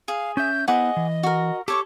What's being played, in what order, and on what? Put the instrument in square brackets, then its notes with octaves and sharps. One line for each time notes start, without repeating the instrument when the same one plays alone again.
[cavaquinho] G#4 [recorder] F5
[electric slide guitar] C#4 E5 [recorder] G6
[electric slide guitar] B3 E4 C5 [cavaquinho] G#4 F#5 D6 [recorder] D#5
[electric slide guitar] E3
[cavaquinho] F#4 A#4
[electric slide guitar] G4 [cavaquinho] A4 C#5 C#6 [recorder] D6